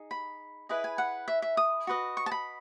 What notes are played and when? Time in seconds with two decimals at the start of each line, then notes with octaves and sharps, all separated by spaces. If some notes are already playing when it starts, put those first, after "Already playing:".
Already playing: D#4 G#4
0.11 B5
0.69 E4 G#4 B4 D#5
0.84 G#5
0.98 F#5
1.28 E5
1.42 E5
1.57 D#6
1.87 F#4 B4 D#5
2.17 C#6
2.26 A5
2.32 B5